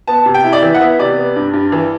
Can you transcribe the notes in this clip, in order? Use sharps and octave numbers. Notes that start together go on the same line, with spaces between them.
B3 A5
C3
G5
E4
D5
E3 E5
F#5
B3 E5
C3 D5
B3
G2
G2
E3